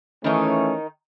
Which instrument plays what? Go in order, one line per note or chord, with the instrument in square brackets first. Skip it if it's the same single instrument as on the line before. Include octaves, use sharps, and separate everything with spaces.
[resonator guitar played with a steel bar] D#3 D#4 [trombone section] E3 A3 C#4